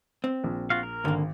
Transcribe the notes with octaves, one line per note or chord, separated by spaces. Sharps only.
C4
A#1
F4 F#4 F5
A#4
G#1 D3 A#3